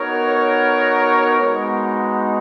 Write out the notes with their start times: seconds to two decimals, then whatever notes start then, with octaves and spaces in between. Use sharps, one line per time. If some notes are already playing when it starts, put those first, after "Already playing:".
Already playing: B3 D#4 F#4 A#4 C#5
1.39 G#3 B3 D#4 F#4